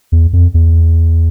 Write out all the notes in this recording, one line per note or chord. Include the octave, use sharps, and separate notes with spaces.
E2
F2
E2